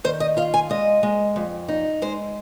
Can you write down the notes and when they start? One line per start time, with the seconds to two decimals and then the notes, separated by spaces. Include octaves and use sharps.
0.04 D#3 C5
0.20 D#5
0.37 F4 F5
0.54 G#5
0.70 G#3 D#5
1.03 G#3
1.36 F2
1.68 D#4
2.02 G#3 C5